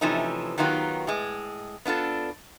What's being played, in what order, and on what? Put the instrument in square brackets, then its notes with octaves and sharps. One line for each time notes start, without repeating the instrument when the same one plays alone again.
[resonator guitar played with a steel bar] C3 E3 F3 A3 C#4 D#4
D#3 F#3 B3 D#4 F4 G4
A2 G#3
B3 D4 F4 A4